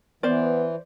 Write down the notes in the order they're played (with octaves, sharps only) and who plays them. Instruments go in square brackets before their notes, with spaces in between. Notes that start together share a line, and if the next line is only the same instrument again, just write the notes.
[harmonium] E3 [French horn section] B3 [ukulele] C5 D5